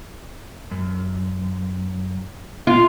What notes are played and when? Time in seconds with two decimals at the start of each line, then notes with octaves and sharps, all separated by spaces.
0.71 F#2
2.67 F4